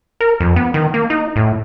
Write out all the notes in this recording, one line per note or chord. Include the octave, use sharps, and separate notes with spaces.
A#4
F2
B3
D#3
A#3
D#4
A2